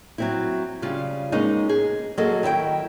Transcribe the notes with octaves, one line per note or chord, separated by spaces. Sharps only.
F#3 C4 E4
C#3 G3 F4
G#3 A#3 B3 C#4 D#4
G#4
F#3 A#3 G#4 A4 D#5
D#3 E4 D#5 G5